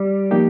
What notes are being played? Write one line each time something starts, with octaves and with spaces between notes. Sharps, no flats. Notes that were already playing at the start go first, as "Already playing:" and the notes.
Already playing: G3
F3 A#3 D#4 G4